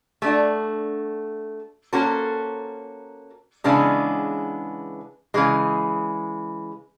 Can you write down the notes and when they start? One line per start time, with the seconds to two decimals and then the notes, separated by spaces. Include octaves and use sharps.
0.22 A3 D4 F#4
1.93 A#3 C#4 F#4 A4 C5
3.64 C#3 E3 G#3 B3 D4
5.34 C#3 E3 G#3